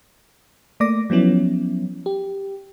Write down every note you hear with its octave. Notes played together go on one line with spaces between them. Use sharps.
A3 A#3 D5 D6 A#6
F3 F#3 B3 C#4 E4
G4